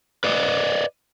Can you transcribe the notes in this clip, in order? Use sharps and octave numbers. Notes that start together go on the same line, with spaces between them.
B4 D5 D#5